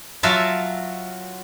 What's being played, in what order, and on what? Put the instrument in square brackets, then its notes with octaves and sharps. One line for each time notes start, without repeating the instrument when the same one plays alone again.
[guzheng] F#3 F4 F#4 E5 G#5 A5